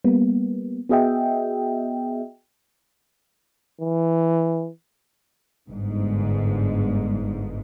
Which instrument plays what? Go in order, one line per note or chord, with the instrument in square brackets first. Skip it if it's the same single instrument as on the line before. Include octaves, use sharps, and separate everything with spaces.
[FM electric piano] G3 A#3 B3
B3 F#4 G#4 D#5 E5 G5
[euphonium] E3
[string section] G1 G#2